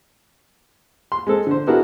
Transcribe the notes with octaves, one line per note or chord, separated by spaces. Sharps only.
C6
G#3 C4 A4
D3 C5
B3 D4 E4 F#4 G#4 A#4